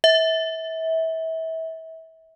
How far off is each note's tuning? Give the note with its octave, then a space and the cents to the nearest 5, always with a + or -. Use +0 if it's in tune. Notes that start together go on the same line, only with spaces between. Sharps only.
E5 -30